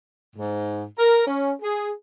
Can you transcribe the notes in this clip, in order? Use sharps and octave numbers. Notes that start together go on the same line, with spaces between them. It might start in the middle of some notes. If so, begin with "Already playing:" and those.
G#2
A#4
C#4
G#4